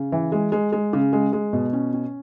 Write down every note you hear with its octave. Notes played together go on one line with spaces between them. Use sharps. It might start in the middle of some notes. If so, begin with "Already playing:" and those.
Already playing: C#3
E3
G#3
G#3
G#3
C#3
G#3
G#3
B2
C#4
C#4